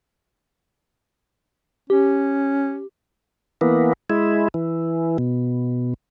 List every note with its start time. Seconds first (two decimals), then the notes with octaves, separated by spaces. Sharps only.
1.90 C#4 G4
3.61 E3 A#3 B3
4.10 G#3 E4
4.54 E3
5.18 B2